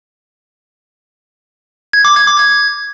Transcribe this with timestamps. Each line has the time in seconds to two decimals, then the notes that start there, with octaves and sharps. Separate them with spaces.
1.93 G#6
2.05 D6
2.16 G#6
2.27 D6
2.38 G#6